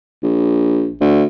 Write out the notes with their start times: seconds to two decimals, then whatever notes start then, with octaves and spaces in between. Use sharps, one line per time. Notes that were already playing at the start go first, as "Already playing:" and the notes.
0.23 A#1
1.01 D2